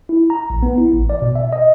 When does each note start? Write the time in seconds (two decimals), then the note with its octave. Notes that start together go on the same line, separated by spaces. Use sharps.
0.09 E4
0.30 A#5
0.50 A#1
0.63 B3
0.78 E4
0.93 A1
1.10 D5
1.22 B2
1.35 E5
1.53 D#5